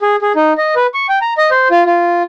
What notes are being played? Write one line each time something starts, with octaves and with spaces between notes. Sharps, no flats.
G#4
G#4
D#4
D#5
B4
C#6
G5
A#5
D#5
C5
F4
F4